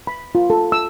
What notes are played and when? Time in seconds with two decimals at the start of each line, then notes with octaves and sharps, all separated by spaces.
0.07 B5
0.35 F4
0.50 A4
0.72 E6